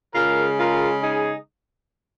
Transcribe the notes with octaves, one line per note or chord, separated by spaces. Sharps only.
C#3 G#3 F4 A#4
F4 A#4
D#4 G#4